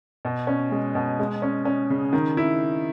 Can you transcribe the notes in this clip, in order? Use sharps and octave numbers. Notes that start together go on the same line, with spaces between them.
B2
C#4
G#3
B2
G#3
C#4
C#4
C#3
D#3
E4